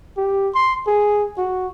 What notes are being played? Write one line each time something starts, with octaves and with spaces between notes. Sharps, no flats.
G4
C6
G#4
F#4